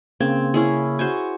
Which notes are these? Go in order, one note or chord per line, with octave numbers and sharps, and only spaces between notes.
C#3 A#3 C4 G#6
C#4 E4 G#4
F#4 C5 G#5